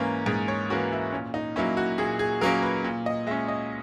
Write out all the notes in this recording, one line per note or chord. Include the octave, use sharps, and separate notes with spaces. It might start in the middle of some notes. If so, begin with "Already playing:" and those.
Already playing: G#2 E3 A#3 C#4
G#2 G#4
C#5
E3 A#3 C#4 F#4
E4
A#2 C#4
D#4
F#3 A#3 C#4 E4
F#4
A#2 G#4
G#4
F#3 A#3 C#4 A#4
B4
A#2
D#5
G#3 C#4 E5
D#5